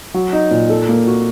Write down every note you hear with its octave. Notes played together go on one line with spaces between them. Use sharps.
F#3
D#4
A#2
A4
A#3
F#4